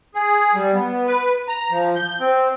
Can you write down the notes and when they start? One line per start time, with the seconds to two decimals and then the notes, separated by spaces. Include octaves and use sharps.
0.15 G#4
0.54 G3
0.74 B3
1.07 B4
1.48 A#5
1.71 F3
1.95 G6
2.20 C4